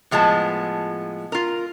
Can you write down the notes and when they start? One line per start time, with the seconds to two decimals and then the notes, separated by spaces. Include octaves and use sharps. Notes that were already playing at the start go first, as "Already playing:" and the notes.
0.11 A2 F3 G#3 B3 A5
1.32 F4 A#4